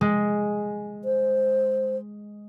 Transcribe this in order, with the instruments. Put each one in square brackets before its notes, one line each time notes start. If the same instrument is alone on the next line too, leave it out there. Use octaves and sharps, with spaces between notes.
[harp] G#3
[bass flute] C5